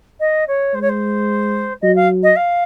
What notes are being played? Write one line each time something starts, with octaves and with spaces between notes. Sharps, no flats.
D#5
C#5
G#3 C5
C#5
C5
F#3 D#5
F5
D#5
F5